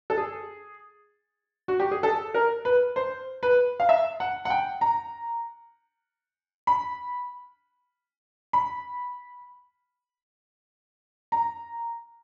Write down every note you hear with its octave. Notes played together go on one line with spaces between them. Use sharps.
A4
G#4
F#4
G4
G#4
A4
A#4
B4
C5
B4
F5
E5
F#5
F#5
G5
A#5
B5
B5
A#5